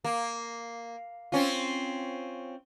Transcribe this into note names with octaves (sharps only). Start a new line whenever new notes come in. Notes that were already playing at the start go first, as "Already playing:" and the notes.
A#3
C4 C#4 F4